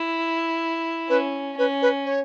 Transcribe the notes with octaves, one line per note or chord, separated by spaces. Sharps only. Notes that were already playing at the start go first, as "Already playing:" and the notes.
Already playing: E4
C#4 B4
C#4 B4
B4
C#5